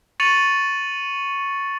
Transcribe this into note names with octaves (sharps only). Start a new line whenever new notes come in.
C#6 A6 C#7 D#7 F7 F#7